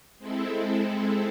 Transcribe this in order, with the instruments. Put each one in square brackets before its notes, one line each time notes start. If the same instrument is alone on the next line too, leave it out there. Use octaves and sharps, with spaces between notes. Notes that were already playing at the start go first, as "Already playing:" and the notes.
[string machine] G#3 C4 E4 A4